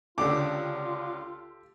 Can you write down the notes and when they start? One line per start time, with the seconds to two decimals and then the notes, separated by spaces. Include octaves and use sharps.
0.18 C#2 D3 D4 F4 G4 A4 D6